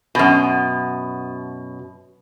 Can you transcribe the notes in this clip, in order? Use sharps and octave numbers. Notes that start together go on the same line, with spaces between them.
F#2 B2